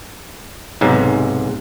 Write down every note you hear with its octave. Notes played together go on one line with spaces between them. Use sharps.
B1 G#2 C3